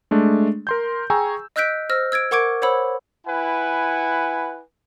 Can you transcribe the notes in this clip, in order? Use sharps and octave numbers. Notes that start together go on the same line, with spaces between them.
G#3 A3 D4
A#4 C6 G6
G#4 G5 G#5 A#5 C#6 E6
D#5 E6 F#6 G6 B6 D7
C5 E6 F6 A#6
E6 G#6 A6 D7
A#4 F#5 C#6 D6 G#6 D7
C5 C#5 F#5 B5 E6
E4 B4 F#5 G#5